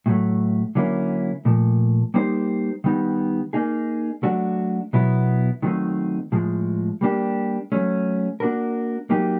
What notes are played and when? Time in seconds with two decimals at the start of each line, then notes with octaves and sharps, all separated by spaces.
0.06 A2 F#3 A3
0.75 D3 F#3 A#3 C#4 E4
1.45 A#2 F3 A3
2.14 G3 A#3 D#4 G4 C5
2.84 D#3 G3 B3 D#4
3.53 A#3 D#4 G#4
4.23 F#3 A3 D4 F#4
4.93 B2 F#3 B3 E4
5.62 D#3 F#3 A3 C4 D#4
6.32 A2 F3 G#3
7.01 G3 A#3 D4 G4
7.72 F#3 A3 C#4
8.40 A#3 D4 F#4 A#4
9.10 F#3 A#3 D#4 G4